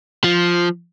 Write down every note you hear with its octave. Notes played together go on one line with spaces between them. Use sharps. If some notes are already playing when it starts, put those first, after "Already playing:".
F3